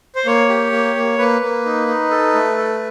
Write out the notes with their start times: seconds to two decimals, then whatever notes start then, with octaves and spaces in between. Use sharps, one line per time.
0.15 C5
0.26 A#3 C#5
0.49 G4
0.72 A#3
0.95 A#3
1.18 A#3 B4
1.42 A#3
1.65 D#4
1.88 D#4
2.11 A4
2.34 A3
2.57 A4